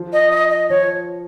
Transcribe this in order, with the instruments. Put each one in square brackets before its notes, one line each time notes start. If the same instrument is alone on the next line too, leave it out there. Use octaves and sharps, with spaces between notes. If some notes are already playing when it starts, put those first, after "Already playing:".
Already playing: [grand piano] F3
[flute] D#5
D#5
D#5
[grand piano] F3 [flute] C#5